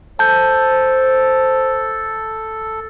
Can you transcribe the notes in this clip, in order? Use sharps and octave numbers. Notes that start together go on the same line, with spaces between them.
A4 C5 A5 G6